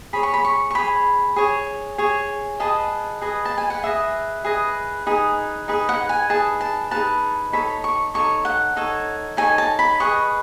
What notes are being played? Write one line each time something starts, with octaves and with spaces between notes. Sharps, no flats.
G#4 C#5 B5
C#6
B5
C#6
C#6
G#4 C#5 B5
G#4 C#5
G#4 C#5
G#4 B4 D#5 A5
G#4 B4 D#5
A5
G#5
F#5
G#4 B4 D#5 E5
G#4 B4 D#5
D#4 G#4 B4
D#4 G#4 B4
F#5
G#5
D#4 G#4 B4 A5
A5
D#4 G#4 B4 A5
D#4 A4 C#5 B5
C#6
D#4 A4 C#5 C#6
F#5
D#4 A4 C#5
D#4 A4 C#5 G#5
A5
B5
G#4 B4 D#5 C#6